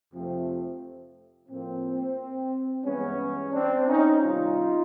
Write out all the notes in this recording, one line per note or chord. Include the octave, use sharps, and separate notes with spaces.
F2 C3 F3 A3 C4
A2 F3 A#3 C4
G2 E3 G#3 B3 C#4
C4 D4
C#4 D#4
C3 D#3 G3 B3 D#4 F4